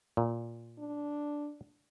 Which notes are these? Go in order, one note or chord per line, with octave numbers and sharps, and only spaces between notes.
A#2
D4